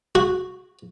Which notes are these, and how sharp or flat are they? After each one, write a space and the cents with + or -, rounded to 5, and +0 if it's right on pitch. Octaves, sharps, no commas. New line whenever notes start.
F#4 -5